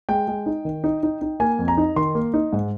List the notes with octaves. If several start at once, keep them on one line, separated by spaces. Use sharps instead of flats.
G#3 G5
G#3
D#4
D#3
D#4
D#4
D#4
A#3 G#5
F2
A#5
D#4
D#3 C6
A#3
D#4
G#2